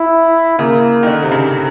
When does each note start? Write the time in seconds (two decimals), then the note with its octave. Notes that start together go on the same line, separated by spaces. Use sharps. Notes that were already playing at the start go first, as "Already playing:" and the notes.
Already playing: E4
0.59 C#3 A#3
1.03 D#3
1.07 D3
1.23 C3
1.32 C#3